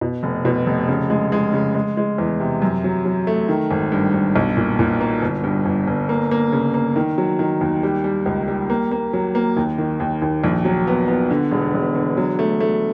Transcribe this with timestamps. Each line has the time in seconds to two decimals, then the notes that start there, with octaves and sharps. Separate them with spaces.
0.01 B2
0.23 F1
0.45 B2
0.66 F1
0.88 C#3
1.10 G#3
1.32 G#3
1.53 C#3
1.75 G#3
1.97 G#3
2.18 E2
2.40 C3
2.62 F#2
2.84 F#3
3.05 F#3
3.27 A3
3.48 D#3
3.71 G#1
3.92 G2
4.14 G2
4.36 B1
4.57 A#2
4.79 A#2
5.00 A#3
5.22 G1
5.44 G2
5.66 G1
5.87 G1
6.09 A#3
6.31 A#3
6.52 C#3
6.74 A#3
6.96 D#3
7.18 F#3
7.39 D#3
7.61 D#2
7.83 G3
8.04 G3
8.26 C#2
8.48 G3
8.70 A#3
8.91 A#3
9.13 F#3
9.35 A#3
9.57 D#2
9.78 D#3
10.00 D#2
10.22 D#2
10.44 A#1
10.65 F#3
10.87 B3
11.08 B3
11.31 D3
11.51 E1
11.74 E1
11.95 D3
12.17 F#3
12.39 A3
12.60 A3